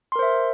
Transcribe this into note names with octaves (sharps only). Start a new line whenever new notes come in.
A#4 C5 E5 C6